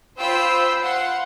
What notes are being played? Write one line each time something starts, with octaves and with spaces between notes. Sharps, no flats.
F4 C5 G5 B5 E6
F5 F#5 C6